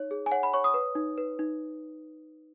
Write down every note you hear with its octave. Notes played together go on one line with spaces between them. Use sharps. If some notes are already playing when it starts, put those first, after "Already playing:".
Already playing: D#4 C#5
G#4
G#5
C#5 F#5
B5
C#5 C#6
D#6
B4
D#4
B4
D#4